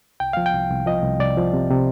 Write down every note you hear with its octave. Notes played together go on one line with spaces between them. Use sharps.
C2 G5
F3 F5
G5
C2
C2
F3 D#5
C2
C2 D5
F3
C3
C3